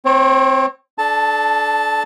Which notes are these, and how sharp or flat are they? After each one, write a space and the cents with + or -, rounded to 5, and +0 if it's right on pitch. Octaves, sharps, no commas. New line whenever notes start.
C4 +0 C#5 -40
D4 +5 A4 -35 A5 +0